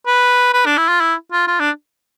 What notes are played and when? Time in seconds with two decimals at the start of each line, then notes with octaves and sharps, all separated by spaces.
0.06 B4
0.53 B4
0.66 D4
0.78 E4
0.88 F4
1.00 E4
1.32 F4
1.48 F4
1.60 D4